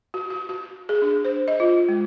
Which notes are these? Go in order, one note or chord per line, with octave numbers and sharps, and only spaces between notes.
F#4
F#4
F#4
G#4
D4
C5
D#5
F4
G#3